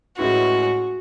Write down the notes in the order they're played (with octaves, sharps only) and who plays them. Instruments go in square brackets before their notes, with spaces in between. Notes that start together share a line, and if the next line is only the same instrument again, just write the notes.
[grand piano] A2 G#3 C#4 E4 B4 [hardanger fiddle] F#4